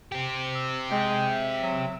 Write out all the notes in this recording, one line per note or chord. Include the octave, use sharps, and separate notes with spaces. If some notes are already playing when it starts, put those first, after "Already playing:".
C4 G4
E6
G#3 G5
E5
F#3